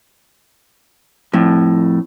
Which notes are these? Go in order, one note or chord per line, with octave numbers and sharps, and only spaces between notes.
F2 A2